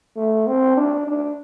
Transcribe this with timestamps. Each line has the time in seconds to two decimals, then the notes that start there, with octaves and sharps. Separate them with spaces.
0.16 A3
0.47 C4
0.77 D4
1.07 D4